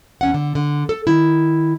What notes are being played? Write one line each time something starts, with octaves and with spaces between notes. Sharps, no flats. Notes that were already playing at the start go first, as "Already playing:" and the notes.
E2 C#4 F#5
D3
D3
A4
D#3 E4